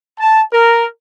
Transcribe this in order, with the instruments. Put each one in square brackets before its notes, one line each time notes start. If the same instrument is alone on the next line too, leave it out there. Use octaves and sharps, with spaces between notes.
[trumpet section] A5
A#4